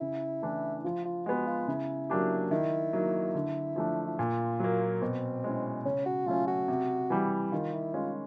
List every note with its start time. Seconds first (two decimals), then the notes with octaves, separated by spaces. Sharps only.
0.01 C#3 E4
0.42 E3 A3 D4
0.84 F3 F4
1.05 F4
1.26 G#3 B3 F#4
1.47 F4
1.68 C#3 E4
2.10 F#3 A#3 D4 G4
2.51 D#3 E4
2.93 F#3 A#3 D#4
3.34 D3
3.76 F3 A3 D4
4.07 E4
4.19 A#2 F4
4.60 F#3 A#3
5.02 B2 C4
5.44 G#3 C#4 E4
5.85 C#3 C#4
6.06 F#4
6.26 F#3 A3 C#4 F4
6.48 F#4
6.68 C3
7.10 E3 G3
7.52 D#3 F4
7.73 E4
7.94 G#3 C#4 F4